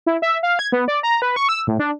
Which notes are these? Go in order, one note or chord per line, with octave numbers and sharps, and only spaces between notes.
E4
E5
F5
G#6
B3
D5
A#5
B4
C#6
E6
A2
D4